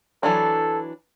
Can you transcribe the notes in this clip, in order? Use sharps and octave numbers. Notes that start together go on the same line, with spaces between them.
E3 F#3 D4 A4